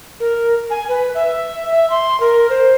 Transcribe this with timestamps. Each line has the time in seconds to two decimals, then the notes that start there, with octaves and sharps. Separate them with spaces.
0.20 A#4
0.70 G#5
0.89 B4
1.15 E5
1.71 E5
1.90 C6
2.20 A#4
2.50 C5